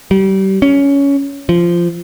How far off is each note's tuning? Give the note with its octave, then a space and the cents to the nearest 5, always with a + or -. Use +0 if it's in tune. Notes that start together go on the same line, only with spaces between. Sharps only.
G3 -30
C#4 +15
F3 -15